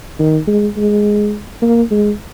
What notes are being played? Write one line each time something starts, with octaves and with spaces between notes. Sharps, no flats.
D#3
G#3
G#3
A#3
G#3